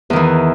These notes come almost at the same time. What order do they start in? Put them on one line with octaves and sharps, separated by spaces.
E2 D#3 E3